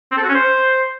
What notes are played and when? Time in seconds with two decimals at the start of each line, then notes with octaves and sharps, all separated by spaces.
0.12 C4
0.18 A4
0.23 F#4
0.29 C#4
0.35 C5